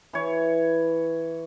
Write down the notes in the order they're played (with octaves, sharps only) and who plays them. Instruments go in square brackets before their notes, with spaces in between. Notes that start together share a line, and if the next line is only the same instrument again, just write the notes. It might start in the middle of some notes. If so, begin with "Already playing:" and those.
[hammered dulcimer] E3 C#5